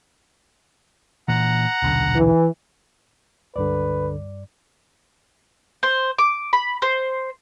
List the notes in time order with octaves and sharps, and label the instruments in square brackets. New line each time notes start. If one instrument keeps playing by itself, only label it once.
[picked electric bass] A#2 E3 [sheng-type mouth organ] F#5 A#5
[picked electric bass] D#1 B1 D3
[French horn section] E3
[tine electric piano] C#2 D3 [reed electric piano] G2 D5 [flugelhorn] B4
[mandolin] C5
D6
B5
C5